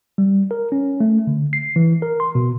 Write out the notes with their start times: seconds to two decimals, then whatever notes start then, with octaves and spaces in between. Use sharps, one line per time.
0.18 G3
0.51 A#4
0.72 C#4
1.00 A3
1.27 D3
1.53 C7
1.76 E3
2.02 A#4
2.20 C6
2.35 B2